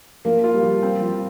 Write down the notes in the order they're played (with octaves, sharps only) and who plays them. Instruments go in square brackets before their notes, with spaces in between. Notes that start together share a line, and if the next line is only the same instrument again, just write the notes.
[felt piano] F3 [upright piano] A#3
[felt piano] F4
[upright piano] G3
[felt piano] F3
C4
F3